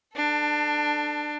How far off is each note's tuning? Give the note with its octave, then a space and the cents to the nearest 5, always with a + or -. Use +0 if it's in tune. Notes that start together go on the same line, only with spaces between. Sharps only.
D4 +20 A4 +0